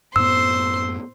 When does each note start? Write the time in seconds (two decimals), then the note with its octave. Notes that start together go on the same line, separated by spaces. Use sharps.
0.16 F#2 A2 B3 C5 C6 E6